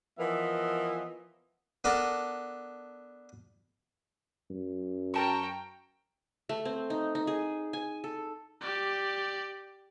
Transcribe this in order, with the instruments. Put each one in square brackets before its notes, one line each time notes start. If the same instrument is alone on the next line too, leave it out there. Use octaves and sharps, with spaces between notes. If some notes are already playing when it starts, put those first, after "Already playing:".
[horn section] E3 F3 B3 A#4 D#5 E5
[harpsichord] B3 D4 A4 A#4
[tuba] F#2
[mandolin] A#4 A5 C#6 [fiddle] G5 A#5
[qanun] A3
C4
D#4
D#4
G#4
G#5
A4
[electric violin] G4 D5